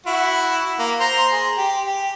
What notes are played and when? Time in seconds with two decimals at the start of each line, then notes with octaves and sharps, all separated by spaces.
0.06 E4 F#4
0.79 A#3
1.00 C5 A#5 C6
1.31 G#4
1.57 G4
1.86 G4